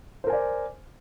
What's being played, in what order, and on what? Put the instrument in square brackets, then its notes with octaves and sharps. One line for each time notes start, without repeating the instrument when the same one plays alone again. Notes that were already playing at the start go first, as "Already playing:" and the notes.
[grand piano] C5
A#4
G#5
D5